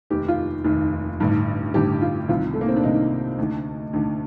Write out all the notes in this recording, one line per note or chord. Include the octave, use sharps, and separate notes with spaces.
F1 D#2 D#3 G4
F4
F1 D#2 D#3
A1 G2 D3
A1 G2 D3 G4
F4
C2 C3 D#3 F4
A3
A#3
C4
D4
C2 C3 D#3 D#4
D2 D3
D2 D3